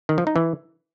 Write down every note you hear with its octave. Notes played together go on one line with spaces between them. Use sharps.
D#3
F3
D#4
E3